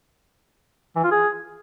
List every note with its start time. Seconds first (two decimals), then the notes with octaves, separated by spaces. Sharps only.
0.96 E3
1.03 F4
1.11 G#4